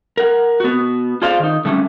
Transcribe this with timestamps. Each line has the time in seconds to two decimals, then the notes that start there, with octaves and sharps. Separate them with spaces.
0.17 A#4 F#5
0.60 B3 F#4
1.22 F4 G#4 A4 C5 D5 F5
1.40 D#3 D#4
1.65 D3 G3 A3 B3 C#4